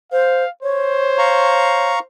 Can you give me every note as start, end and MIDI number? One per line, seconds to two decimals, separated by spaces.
0.12 0.44 72
0.12 0.50 77
0.63 2.06 72
0.63 1.93 73
1.18 1.99 77
1.18 1.99 82
1.18 1.99 85